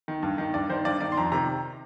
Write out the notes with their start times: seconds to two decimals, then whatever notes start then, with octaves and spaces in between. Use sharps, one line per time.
0.08 D#3
0.23 G2
0.38 D#3
0.54 G2 D5
0.69 D#3 C5
0.85 G2 D5
1.01 D#3 D5
1.12 C6
1.17 F2 A#5
1.32 C3 D#3 A#5